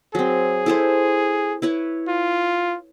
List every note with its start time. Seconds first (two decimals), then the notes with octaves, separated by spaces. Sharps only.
0.15 F#3 C4 G#4
0.66 E4 A4 C5
1.62 E4 B4 C#5
2.08 F4